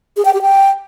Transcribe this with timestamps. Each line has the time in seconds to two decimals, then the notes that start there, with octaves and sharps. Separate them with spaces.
0.17 G#4
0.25 G5
0.34 G4
0.42 G5